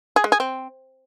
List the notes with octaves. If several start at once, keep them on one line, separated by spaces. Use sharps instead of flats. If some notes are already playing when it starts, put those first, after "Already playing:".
G#4
G#3
G#4
C4